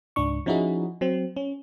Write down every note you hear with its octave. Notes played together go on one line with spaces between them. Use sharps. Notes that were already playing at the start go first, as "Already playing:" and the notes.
C#2 G#2 D4 C#6
F3 C#4 D#4 E4 F#4 G#4
F#3 C4
C#4